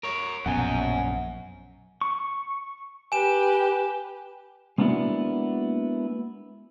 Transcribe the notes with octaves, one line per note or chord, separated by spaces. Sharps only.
A#4 C#5
A#1 F#2 B2 F#5 G#5
C#6
G4 B4 G#5 E7
G#3 A#3 B3 D4 E4 F#4